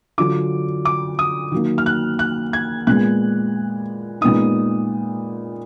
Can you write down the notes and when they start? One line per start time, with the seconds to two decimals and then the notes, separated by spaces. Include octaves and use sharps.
0.18 D3 F#3 D4 F4 D6
0.85 D6
1.19 D#6
1.52 D#3 F#3 A#3
1.78 F6
1.86 F#6
2.19 F#6
2.53 G#6
2.87 A#2 G#3 B3 F#6
4.21 A#2 G#3 B3 D#4 D#6